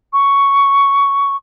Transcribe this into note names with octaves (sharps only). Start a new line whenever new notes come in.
C#6